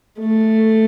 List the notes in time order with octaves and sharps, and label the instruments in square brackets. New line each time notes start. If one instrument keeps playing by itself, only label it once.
[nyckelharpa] A3